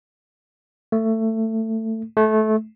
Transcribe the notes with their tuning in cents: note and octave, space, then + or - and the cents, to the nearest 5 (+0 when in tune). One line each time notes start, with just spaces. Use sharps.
A3 +20
A3 -20